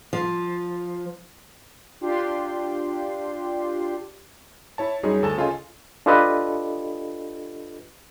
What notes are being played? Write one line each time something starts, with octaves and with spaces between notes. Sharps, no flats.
F3
D4 F4 G4 C6
E4 C#5 A5
F#2 G3 D#4 G#4 C#5
D2 A4 G#5 A5 E7
C#3 F4 A4 D#5 G#5
D4 F4 G4 A4 B4 D#5